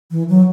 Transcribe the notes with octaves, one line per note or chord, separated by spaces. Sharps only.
E3
F#3